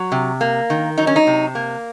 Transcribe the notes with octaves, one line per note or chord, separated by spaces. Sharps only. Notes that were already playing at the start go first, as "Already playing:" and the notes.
Already playing: F#3
C3
A#3
D#3
F#3 D#4
C#4
D#4
C3
A#3